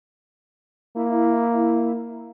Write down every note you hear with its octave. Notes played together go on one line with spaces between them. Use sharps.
A#3 E4